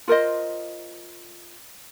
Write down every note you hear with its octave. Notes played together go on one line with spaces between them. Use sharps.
F4 A#4 C5 D#5